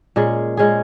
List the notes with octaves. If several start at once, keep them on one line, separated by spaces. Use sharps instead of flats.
A#2 G#3 C#4 G#4
A#2 G#3 C#4 G#4